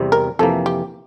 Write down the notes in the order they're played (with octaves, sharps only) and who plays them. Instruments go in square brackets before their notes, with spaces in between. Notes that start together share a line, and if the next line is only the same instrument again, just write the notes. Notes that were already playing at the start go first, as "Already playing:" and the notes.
Already playing: [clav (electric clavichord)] E2 C3 G3 C4
[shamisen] A#4
[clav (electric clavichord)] F2 C3 E3 A#3 [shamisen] A4
[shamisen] G4